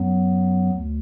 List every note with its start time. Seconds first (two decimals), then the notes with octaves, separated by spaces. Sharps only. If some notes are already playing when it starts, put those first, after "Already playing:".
Already playing: F#2 F#3 B3
0.71 D2